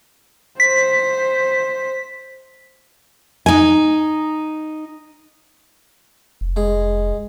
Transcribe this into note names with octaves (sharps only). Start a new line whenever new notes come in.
C5 B6
D#4 G#5
F1
G#3